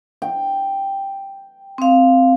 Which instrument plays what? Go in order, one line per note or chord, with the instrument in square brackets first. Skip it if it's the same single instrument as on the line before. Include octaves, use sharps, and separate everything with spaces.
[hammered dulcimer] G5
[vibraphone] C4 F5